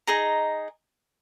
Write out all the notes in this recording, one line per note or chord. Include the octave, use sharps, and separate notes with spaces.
D#4 G#4 D#5 A#5